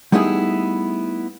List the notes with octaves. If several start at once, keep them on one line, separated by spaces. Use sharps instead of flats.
G3 A3 B3 D#4 E4 G#4